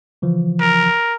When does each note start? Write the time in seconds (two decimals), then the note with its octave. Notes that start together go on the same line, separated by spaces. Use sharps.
0.22 C#3 E3 F3
0.61 A#4